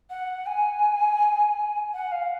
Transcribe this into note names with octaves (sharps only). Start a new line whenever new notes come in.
F#5
G#5
F#5
F5